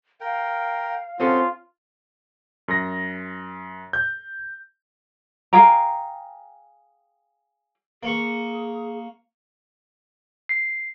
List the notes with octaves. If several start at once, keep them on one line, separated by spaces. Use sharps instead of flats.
A#4 F5 G5
C4 C#4 F4 F#4 G#4 A4 C6
F#2 A#6
G6
G#4 F5 G5 A#5
A#3 G#4 C#6
C7